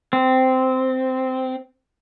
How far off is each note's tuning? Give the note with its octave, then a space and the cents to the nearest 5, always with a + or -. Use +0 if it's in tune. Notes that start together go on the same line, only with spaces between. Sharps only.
C4 -10